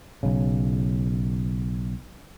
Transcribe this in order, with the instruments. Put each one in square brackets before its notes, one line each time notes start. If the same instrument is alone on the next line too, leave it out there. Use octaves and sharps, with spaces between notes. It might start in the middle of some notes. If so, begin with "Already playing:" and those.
[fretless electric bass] B1 C#3